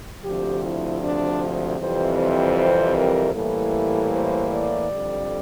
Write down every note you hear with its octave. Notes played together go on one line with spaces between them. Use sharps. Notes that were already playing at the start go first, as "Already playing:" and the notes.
D2 C3 F3 G4
E4
D4
F2 C3 E3 G3 C5
C5
C5
A#4
A2 E3 G3 A#3 A4
C5
D5
F2 D3 G3